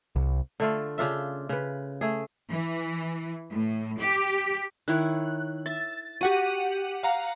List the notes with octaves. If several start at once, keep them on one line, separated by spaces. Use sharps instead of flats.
C2
D3 A3 F4
C#3 D4 F4 E5
C#3 B4
A3 G#4
E3
A2
G4
D#3 E4 C#5 F#6
E5 A6
F#4 G4 F#5 D#7
F5 F#5 A#5